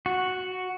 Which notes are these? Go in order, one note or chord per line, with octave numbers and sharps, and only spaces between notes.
F#4